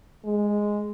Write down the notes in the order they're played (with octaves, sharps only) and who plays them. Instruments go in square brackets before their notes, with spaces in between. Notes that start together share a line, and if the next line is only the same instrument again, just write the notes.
[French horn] G#3